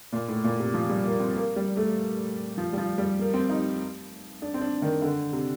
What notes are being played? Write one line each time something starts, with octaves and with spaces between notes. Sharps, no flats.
A#2
A2
A#2
C3
F3
G3
A#3
C4
A#3
G3
A3
F3
G3
F3
G3
A#3
C4
D#4
D4
C4
D4
D#3
D3
C3